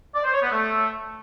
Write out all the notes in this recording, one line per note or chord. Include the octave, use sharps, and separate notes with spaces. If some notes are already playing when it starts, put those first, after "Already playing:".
D5
C5
C#5
B3
A3